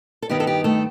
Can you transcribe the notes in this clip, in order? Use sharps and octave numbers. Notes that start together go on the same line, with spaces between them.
A4
G2 D#3 G3 B3 D#4 G4
A4
G4
A3 A4